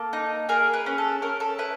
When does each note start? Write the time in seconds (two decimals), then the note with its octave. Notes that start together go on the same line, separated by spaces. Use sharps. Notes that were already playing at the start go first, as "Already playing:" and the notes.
Already playing: A#3 A4
0.13 D#4
0.49 G#4 A#4
0.73 B4
0.86 C#4
0.98 A4
1.22 C#4 A#4
1.40 A4
1.58 E4 B4